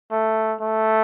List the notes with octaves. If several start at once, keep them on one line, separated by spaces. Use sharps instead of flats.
A3
A3